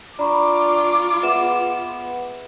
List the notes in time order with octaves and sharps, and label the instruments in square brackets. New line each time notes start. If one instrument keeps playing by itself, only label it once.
[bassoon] D4 [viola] F4 D6 [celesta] A#5 B5 C#6
[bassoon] B3 [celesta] G#4 E5 E7